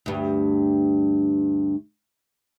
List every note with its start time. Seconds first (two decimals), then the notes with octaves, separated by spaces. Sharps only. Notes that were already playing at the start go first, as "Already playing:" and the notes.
0.06 D2 G2